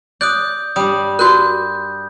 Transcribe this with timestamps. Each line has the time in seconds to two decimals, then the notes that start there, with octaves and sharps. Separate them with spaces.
0.21 D5 D#6 F#6 G6
0.76 G2 G3 D#6
1.19 F#4 A#4 F#6 G6